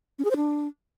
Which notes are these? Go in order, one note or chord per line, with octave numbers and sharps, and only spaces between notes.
C#4
G#4
C5
D4